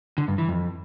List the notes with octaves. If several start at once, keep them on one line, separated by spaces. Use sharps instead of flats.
D3
G2
E3
F2